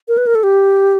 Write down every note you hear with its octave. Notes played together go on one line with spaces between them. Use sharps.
A#4
B4
A#4
A4
G4